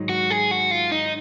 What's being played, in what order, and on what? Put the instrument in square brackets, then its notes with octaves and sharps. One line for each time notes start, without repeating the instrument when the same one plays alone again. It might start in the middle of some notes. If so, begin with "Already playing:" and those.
Already playing: [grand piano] G#2 D#3 F#3
[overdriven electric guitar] F#4
G#4
F#4
F4
D#4